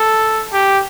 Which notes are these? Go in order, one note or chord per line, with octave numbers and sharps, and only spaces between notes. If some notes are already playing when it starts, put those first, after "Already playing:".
Already playing: A4
G4